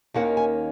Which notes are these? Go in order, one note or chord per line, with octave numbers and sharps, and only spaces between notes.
D#2 D#3 A#3 C#4 F#5
G#5